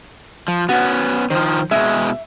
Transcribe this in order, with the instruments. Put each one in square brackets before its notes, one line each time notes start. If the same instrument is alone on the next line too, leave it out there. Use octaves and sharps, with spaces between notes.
[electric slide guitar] F3
[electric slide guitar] B3 C#4 [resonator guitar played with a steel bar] F#4
[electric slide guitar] D#3 F3 [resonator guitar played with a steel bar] C5
[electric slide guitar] B2 G#3 [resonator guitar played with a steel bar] E5